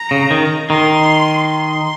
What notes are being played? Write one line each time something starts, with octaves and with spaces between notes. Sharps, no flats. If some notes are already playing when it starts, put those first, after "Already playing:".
Already playing: A#5
C#3
D#3
D#3 C6
C6